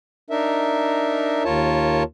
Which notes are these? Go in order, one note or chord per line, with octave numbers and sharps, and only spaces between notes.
D4 D#4 A#4 E5
D#2 F4 A#4 C#5 A5